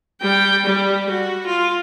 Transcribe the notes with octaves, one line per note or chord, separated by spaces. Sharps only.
G3 G5
G3
F#4
F4